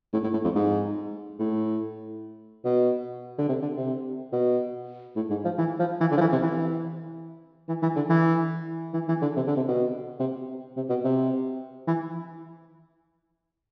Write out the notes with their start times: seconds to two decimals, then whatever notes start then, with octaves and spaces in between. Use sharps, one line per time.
0.13 A2
0.23 A2
0.33 A2
0.44 F2
0.55 G#2
1.39 A2
2.65 B2
3.38 D3
3.49 C3
3.62 D3
3.77 C3
4.33 B2
5.16 A2
5.30 G#2
5.45 F3
5.58 E3
5.79 F3
6.00 E3
6.11 D3
6.17 F3
6.21 E3
6.32 C3
6.42 E3
7.68 E3
7.82 E3
7.96 D3
8.09 E3
8.94 E3
9.08 E3
9.21 D3
9.36 C3
9.47 D3
9.57 C3
9.68 B2
10.20 C3
10.76 C3
10.89 B2
11.04 C3
11.87 E3